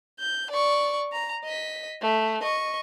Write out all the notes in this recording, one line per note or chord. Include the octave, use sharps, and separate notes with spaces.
G6
D5 C#6
A#5
D#5 B6
A3
D#5 C#6